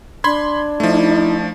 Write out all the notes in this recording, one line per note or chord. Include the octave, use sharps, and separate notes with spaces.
D4 B5 C6 G#6
F3 A3 D#4 E4